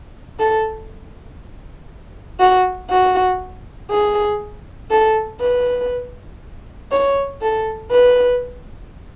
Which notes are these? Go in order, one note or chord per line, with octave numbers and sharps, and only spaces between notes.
A4
F#4
F#4
G#4
A4
B4
C#5
A4
B4